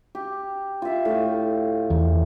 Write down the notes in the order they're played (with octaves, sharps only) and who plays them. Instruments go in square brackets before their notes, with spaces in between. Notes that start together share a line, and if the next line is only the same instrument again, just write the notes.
[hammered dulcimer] G4
F4 E5
A2 F5
[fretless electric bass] E2